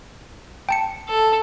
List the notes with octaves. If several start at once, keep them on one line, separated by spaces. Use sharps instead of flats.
G5 A5 C#7
A4